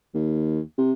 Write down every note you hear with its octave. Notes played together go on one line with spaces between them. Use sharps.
D#2
C3